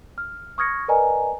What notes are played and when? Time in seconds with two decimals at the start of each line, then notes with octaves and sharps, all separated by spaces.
0.18 F6
0.58 C#6 D#6 F6 G#6 A#6 C#7
0.88 A#4 B4 D5 D#5 G#5 A#5